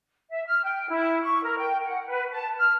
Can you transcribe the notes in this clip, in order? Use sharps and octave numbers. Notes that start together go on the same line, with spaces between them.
E5
F6
G5
E4
C#6
A#4
G5
F#5
B4
A5
F6